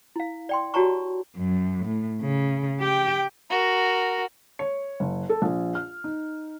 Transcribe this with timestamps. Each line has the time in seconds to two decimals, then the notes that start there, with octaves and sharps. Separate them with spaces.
0.16 E4 F5
0.49 D5 G5 C6
0.74 F#4 G4 C#5 A5 A#5 C#6
1.37 F#2
1.85 A2
2.22 C#3
2.80 G4 G5
3.50 F#4 A#4
4.59 C#5
5.00 F#1
5.29 A4
5.42 A#1
5.75 F6
6.04 D#4